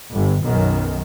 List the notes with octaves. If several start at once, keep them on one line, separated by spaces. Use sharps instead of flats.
G1
B1 F#2 D#3